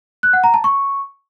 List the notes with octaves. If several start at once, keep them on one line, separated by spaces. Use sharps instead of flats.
F#6
F#5
A#5
A5
C#6